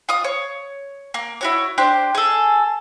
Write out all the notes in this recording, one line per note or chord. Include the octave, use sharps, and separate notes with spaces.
F4 D#6
C#5
A#3
E4 F#4 C#5
D4 G4 C5
G#4 A4